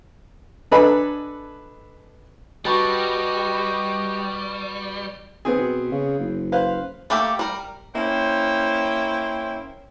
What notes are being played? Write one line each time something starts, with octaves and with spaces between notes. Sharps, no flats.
D4 A4 B4 D#5 G#5 B5
G3 F#4 G4 B4 D#5 A5
D#2 B3 C4 G#4
B2
C#3
F#1
B4 C5 F5
A3 A#3 G4 A4
G3 A#4
A#3 C#4 E4 C5 G5